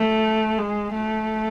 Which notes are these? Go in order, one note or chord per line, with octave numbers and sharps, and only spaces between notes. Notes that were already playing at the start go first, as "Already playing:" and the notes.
Already playing: A3
G#3
A3